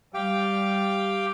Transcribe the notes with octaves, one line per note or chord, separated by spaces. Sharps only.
G3 G4 F5 G5